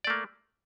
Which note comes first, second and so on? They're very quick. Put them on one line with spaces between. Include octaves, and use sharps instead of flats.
D5 A3 A#3